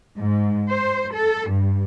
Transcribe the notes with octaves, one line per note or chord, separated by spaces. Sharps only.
G#2
C5
A4
G2